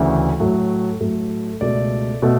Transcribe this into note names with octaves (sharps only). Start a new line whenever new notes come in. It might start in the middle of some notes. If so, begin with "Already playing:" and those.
Already playing: D2 C#3 E3 A3
A2 F#3 A3
A2 F#3 A3
C#2 B2 A3 D5
B2 A3